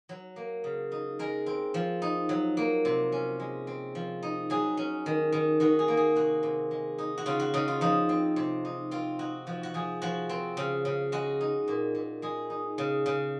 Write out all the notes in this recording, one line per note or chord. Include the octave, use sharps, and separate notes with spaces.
F#3
A#3
C#3
D#4
G#3 A#4
C4
F3
D#4
F#3
A#3
C3
C#4
G#3
C4
F3
D#4
F#3 G#4
C#4
D#3
D#3
D#3 F#4
G#4
A#3
G#4
C3 F#4
C3
G#3
D#4
F#4
C#3 F4
F#4
C#3 D#4
F4
F3 D#4
C4
C3
D#4
C4 F4
D#4 F#4
F3 F#4
F#4
F3 G#4
F3 F#4
C4
C#3
C#3
G#3 F#4
D#4
A#2
A#2
G#3 G#4
D#4
C#3
C#3